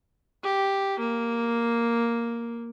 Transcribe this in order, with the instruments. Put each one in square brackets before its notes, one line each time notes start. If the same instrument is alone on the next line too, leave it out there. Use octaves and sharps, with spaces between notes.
[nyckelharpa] G4
A#3